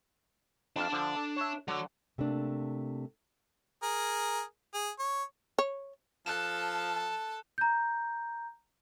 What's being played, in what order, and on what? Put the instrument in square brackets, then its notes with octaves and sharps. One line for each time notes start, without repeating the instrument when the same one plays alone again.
[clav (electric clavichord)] F2 F5 [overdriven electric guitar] D4 A5
[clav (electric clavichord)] D3 F3
A4
C#5 E5
[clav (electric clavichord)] D3 [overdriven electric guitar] F#3
[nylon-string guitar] C3 A3 A#3 D4
[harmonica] G#4 A#4
G#4
C#5
[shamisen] C#5
[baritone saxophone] F3 [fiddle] A4 A5 [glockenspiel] F#6 E7
[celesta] A#5 G6